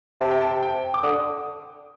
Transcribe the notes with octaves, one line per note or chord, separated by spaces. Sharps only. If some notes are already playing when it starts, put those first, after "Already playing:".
C3 A5
G5
A5
G5
D6
D3 D#6